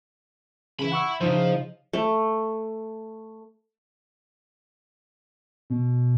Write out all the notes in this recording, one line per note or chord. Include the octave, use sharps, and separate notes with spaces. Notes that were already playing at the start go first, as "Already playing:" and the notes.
C#3 E3 E5 B5
F#5 C#6 E6
C#3 F3 D#4 E4 C5 F5
A3
B2